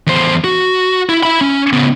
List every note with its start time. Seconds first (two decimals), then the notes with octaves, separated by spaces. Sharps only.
0.07 E2 C5
0.44 F#4
1.09 E4
1.23 E4 B5
1.41 C#4
1.73 C#3 B3